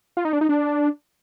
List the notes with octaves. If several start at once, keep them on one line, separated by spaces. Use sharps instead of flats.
F4
D#4
D4
D#4
D4